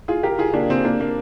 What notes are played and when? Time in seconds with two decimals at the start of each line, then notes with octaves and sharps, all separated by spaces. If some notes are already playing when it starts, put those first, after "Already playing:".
0.08 F4 G#4
0.23 G4 A#4
0.38 F4 G#4
0.54 A#3 D4
0.70 C4
0.85 A#3 D4
1.00 A#3